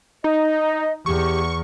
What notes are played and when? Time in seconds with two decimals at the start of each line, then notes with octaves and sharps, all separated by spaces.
0.24 D#4 D#5
1.06 E2 G4 C#6